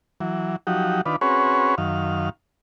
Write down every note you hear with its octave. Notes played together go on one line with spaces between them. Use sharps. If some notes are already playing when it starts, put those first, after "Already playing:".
E3 F#3
F3 F#3 D#4 F#4 G4
D#3 D4 F4 B4
C4 C#4 F#4 G#4 B4 C#5
F#2 D#3 F5